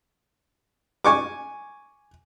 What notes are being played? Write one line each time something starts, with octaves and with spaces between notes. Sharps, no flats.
G#5 C#6 D6